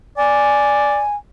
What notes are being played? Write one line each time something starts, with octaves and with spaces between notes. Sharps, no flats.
D5 G#5